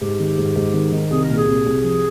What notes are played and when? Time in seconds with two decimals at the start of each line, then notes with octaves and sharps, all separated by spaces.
0.01 G#2 G4
0.20 D#3
0.38 G#2
0.56 G#2
0.74 D#3
0.92 D#3
1.11 C2 G#4
1.23 A#4
1.29 A#2
1.37 G#4
1.47 C2
1.66 C2
1.84 F3